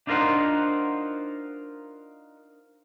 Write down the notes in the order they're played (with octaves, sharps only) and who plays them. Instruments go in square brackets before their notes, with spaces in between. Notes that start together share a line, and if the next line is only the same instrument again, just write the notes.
[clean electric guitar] D4 D#4 F4 A#4 C5 F#5